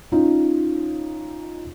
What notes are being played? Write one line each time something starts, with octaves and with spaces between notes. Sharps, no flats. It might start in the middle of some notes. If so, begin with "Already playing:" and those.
C#4 D#4 F4